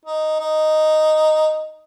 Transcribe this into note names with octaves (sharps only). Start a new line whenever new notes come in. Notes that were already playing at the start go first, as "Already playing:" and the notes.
D#4
D#4